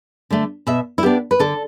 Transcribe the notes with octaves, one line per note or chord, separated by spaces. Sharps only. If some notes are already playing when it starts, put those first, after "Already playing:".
D3 A3
B2 E5
E4
B3 D4 G4
B4
D3 A4